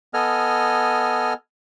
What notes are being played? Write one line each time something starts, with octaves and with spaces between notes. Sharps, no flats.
B3 A4 D#5 G#5 F6